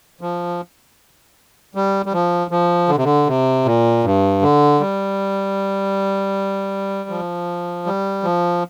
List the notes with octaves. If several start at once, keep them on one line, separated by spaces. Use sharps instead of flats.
F3
G3
G3
F3
F3
D3
C3
D3
C3
A#2
G2
D3
G3
F3
G3
F3